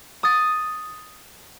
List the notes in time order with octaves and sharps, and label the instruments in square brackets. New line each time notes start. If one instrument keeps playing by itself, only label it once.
[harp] D#6 A6